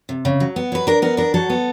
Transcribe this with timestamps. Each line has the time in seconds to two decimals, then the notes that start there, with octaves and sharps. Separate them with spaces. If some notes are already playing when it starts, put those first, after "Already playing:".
0.09 C3
0.25 C#3
0.40 F#3
0.56 B3
0.72 F#3 B4
0.87 D4 A#4
1.02 B3 A#4
1.17 D4 A#4
1.34 F#3 A4
1.50 B3